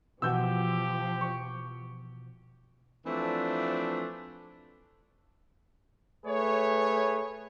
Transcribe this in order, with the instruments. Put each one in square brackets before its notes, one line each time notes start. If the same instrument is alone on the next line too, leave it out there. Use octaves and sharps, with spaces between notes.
[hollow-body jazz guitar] B2 E3 F#4 [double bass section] F3 [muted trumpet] G4 [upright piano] E6 G6
[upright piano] C#6
[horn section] E3 F3 A3 C4 D4
[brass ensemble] A3 G#4 B4 C#5